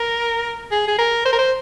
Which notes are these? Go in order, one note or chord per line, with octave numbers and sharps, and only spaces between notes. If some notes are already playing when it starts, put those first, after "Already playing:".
Already playing: A#4
G#4
G#4
A#4
C5
A#4
C5